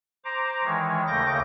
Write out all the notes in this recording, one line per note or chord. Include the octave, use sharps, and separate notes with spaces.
C5 A#5 D6
D#3 E3 G#3 C#5
D#2 C#3 A3 D6 G6 A#6